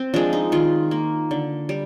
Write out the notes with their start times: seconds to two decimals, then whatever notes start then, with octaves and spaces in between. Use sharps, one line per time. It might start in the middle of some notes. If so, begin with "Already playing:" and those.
Already playing: C4
0.14 F3 G#3 D4
0.33 D#4
0.52 D#3 F4
0.91 A#3
1.31 D3
1.69 G3